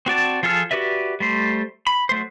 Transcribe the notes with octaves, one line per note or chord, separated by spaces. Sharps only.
C4 F#4 D5 A5
F3 F4 G#4 A4 F6
F#4 G4 B4 D5 E5
G3 A3 C5
B5
F#3 A3 C5